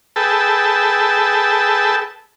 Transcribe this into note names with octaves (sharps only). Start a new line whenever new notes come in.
G#4 A4 B4 G5 A5 E6